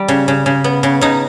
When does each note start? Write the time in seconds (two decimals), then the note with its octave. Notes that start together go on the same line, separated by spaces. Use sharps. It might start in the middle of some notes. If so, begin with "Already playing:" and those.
Already playing: G3
0.08 C#3
0.28 C#3
0.46 C#3
0.64 B3
0.83 C#3
1.01 C#3 D#4